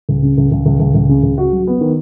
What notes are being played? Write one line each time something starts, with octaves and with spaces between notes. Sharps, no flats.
C#2
C#3
C#2
C#2
C#2
C#2
C#2
C#3
C#2
F#4
F#3
B3
D#3